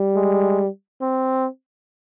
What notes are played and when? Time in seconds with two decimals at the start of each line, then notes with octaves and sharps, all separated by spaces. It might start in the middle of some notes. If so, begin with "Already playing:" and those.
Already playing: G3
0.15 G#3
1.01 C4